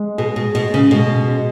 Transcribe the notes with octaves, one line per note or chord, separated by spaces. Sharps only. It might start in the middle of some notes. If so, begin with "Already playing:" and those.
Already playing: G#3
B2 G#4
B2
B2 G#3
C#3
B2 G#3
G#3